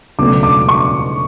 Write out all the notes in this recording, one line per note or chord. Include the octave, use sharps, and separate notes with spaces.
C#2 B2 F#3 A3 D4 D6
D6
C#6